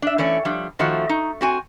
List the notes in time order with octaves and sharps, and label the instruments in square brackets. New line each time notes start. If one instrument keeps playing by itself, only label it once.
[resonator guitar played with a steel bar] D4 E5
E3 A3 C#4 D5
F3 G3 D4
D#3 F3 A3 F#4
D#4
C4 F#4 G#5